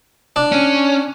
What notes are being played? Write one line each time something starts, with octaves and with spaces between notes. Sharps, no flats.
D4
C#4